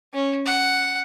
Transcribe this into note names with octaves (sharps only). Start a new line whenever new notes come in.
C#4
F#5